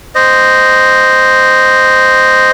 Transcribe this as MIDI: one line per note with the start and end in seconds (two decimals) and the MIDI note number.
0.15 2.51 72
0.15 2.51 75